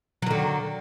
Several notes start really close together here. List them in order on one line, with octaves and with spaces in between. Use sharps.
F#3 D#3 D3